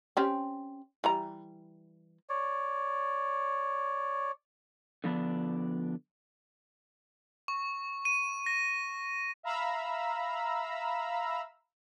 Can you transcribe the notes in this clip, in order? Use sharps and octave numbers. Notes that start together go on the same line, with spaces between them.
C4 C#4 G4
E3 G3 A#5
C#5 D5
D3 F3 B3 D4
C#6
D#7
A#6
E5 F5 A#5 B5 E6